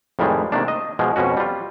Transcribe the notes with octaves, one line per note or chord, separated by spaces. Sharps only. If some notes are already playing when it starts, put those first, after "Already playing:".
F2 A2 D#3 G3 G#3
C3 D#3 A3 A#3 D4
D#5
B2 F3 G#3
F2 B2 C#4 F#4
G3 F4